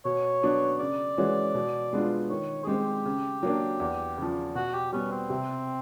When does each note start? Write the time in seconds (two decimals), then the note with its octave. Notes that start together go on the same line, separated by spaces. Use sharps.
0.05 B2 C#5
0.43 F#3 B3 D4
0.79 C#3 D5
1.18 E3 G#3 C#4 F#4
1.55 B2
1.93 G#3 B3 D4 F4
2.30 D#3 C#5
2.64 G#4
2.67 G#3 C4 G4
3.06 C#3
3.43 F#3 A#3 D4
3.80 E2
4.18 C#3 F3
4.55 B2 F#4
4.74 G4
4.92 G3 B3 C#4
5.11 C4
5.30 C3